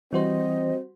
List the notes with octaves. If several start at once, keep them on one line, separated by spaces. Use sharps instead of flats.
E3 G3 C4 F#4 C5 D#5